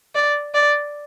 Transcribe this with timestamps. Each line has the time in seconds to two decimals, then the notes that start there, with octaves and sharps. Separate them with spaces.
0.15 D5
0.54 D5